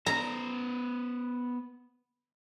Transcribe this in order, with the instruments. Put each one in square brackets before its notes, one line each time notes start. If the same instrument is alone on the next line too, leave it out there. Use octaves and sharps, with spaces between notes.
[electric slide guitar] B3 C5 [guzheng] A#5